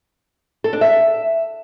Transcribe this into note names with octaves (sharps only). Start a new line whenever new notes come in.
A4
D4
E5